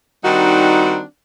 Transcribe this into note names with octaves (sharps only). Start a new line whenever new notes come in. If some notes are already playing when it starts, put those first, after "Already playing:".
D#3 G3 C4 D4 D#4 F#4